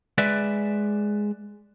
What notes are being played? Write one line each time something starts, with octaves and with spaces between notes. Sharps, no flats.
G#3 B4 D5 E5